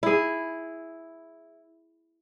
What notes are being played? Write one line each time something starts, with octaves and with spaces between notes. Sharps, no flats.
E4 G#4